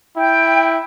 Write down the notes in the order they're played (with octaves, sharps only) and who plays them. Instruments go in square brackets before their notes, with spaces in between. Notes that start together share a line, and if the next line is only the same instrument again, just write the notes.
[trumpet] E4 [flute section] G5